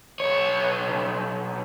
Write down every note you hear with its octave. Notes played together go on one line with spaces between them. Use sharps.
B1 C#5